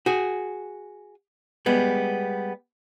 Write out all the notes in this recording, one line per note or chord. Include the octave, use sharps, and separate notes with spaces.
F#4 G#4
G3 G#3 B3